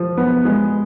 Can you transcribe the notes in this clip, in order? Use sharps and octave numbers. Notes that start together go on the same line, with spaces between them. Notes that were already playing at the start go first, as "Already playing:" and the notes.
Already playing: F3
B3
G#3